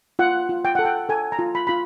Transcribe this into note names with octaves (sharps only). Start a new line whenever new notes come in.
F4 F#5
F4
G5
A4 F#5
G5
A4 G#5
A#5
F4
B5
F4 B5